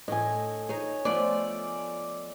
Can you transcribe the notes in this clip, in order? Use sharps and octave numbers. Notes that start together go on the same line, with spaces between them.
A2 D#5 G#5
D#4 G#4 C#5
F3 A3 B3 D5